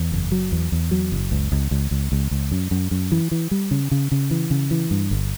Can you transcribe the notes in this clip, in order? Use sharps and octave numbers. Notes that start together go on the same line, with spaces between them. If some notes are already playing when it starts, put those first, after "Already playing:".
Already playing: E2
F#1
F#3
E2
E2
F#3
F#1
C#2
C#2
C#2
C#2
C#2
C#2
F#2
F#2
F#2
E3
E3
G3
C#3
C#3
C#3
E3
C#3
E3
G2
G1